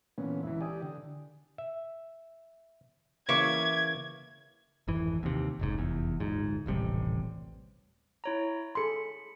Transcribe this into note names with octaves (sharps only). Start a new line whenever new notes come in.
A#2 D3 E3 B3 C#4
C#2 E3 E4
G4 D5 G#5 D#6
D3
E5
C#3 E3 A#3 E5 C#6 D6 G#6
G#1 F2 E3
D#2 C3
F1 C#2 G#2
F1 E2
D1 G1 G#2
D#1 A1 C3 G3
E4 C#5 A#5
G#4 A4 B5 C6 C#7